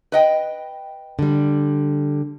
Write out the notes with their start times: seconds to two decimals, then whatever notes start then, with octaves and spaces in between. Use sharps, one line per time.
0.12 B4 D#5 G5
1.19 D3 G3